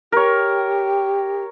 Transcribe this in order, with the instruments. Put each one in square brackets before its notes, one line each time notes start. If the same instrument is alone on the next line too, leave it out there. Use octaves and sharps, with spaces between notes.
[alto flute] G4 [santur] A#4 C#5